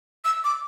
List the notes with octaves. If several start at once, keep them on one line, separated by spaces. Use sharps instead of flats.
E6
D6